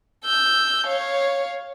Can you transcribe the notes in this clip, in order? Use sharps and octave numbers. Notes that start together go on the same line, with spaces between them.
E6 G6
C#5 F5